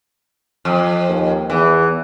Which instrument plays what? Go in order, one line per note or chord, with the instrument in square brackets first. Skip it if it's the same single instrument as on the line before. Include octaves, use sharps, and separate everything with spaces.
[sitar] F2
[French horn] D#2
[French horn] E2 [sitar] E3